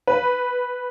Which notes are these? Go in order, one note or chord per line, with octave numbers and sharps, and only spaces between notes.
B4